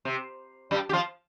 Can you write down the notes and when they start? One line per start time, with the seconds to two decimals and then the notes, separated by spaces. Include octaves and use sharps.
0.05 C3
0.71 G2 G3
0.89 G4
0.93 F3 F4